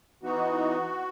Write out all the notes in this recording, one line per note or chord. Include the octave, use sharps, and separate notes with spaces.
E3 B3 D#4 F#4